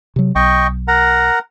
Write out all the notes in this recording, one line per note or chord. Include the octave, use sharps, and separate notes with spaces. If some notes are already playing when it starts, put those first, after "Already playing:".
C3 F#3
B1 D#5 G5 C#6
A#4 F#5 A#5